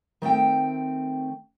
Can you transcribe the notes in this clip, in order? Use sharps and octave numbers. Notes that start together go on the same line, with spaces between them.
D#3 A3 C4 G5